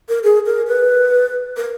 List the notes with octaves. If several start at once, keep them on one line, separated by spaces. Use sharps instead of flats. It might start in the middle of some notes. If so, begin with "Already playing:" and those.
A#4
G#4
A#4
B4
A#4